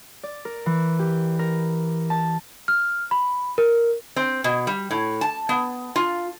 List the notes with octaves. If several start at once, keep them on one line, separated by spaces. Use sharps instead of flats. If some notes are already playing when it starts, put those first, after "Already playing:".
D5
A#4
E3
G4
A#4
A5
F6
B5
A#4
C4
B2
G3
A2
A5
B3
F4